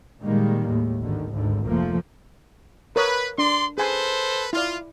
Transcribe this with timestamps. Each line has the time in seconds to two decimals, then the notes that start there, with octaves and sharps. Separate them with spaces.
0.23 A#2 D#3 G3 G#3 A#3
0.66 D#2 A2
1.01 G#1 D3 D#3
1.31 G#1 D2 G#2 D3
1.65 F1 F3 A3 A#3
2.96 A#4 B4 C#5 D#6
3.38 D4 D5 C6
3.78 G#4 A4 B4 C5 G#5 C6
4.53 E4 F4 D5